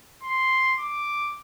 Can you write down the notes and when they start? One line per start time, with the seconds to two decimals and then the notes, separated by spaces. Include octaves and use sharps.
0.23 C6
0.79 D6